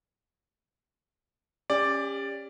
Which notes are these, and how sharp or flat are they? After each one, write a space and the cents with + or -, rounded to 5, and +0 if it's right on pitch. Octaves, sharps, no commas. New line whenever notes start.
C#4 +0 G4 +35 D5 +0